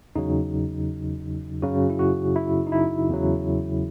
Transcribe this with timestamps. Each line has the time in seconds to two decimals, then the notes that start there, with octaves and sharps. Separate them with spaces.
0.16 E2 C#3 F#3 D#4
1.62 F#2 C#3 F#3 F#4
1.90 E4
1.99 F#4
2.36 E4
2.67 D#4
2.72 E4
3.09 E2 C#3 F#3